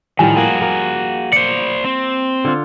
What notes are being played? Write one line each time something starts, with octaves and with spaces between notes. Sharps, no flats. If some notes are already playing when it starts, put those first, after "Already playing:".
A2 D#3 F3 G3 G#5
A#3 F#4 G#4
A#3
C5 D5 C#7
C4
D3 F4